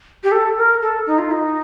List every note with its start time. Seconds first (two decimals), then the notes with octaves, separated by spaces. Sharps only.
0.24 G4
0.32 A4
0.57 A#4
0.82 A4
1.07 D#4
1.19 F4
1.31 D#4